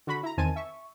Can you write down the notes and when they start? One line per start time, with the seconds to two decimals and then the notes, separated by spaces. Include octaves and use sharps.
0.07 D3 F#4 B5
0.23 E4 A#5
0.37 E2 D#3 C4 G#5 A5 D#7
0.56 E5 C#6